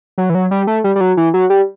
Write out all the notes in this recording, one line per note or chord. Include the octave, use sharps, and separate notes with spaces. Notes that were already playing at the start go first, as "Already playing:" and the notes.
F#3
E3
F#3
G3
A3
G3
G3
F#3
E3
F#3
G3